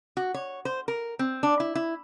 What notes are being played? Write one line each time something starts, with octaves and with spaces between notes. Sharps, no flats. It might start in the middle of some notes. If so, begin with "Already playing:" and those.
F#4
C#5
C5
A#4
C4
D4
E4
E4